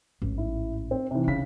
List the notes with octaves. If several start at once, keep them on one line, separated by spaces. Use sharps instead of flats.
A1 G#2
E4
C4
C3 E3
C#3 C#4 B6